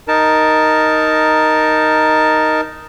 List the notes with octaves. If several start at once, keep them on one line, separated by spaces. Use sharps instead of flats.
D#4 A#4 A5